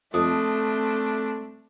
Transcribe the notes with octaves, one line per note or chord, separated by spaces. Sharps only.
F2 A3 C4 D4 D#6